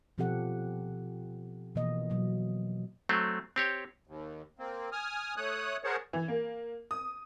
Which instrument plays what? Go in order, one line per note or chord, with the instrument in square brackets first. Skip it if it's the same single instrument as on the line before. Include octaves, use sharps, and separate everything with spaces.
[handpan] B2 F3 C4 G4 A4 F#5
B2 E3 F3 A#3 D#5
B2 F#3
[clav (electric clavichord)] F#3 A3 C4
C4 G4 C#5
[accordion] D#2
A#3 C4
G#5 D#6 F6
A3 C#5 D#6 F#6
G#4 A#4 C5 C#5 F#5 A5
[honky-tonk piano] E3
A#3
D#6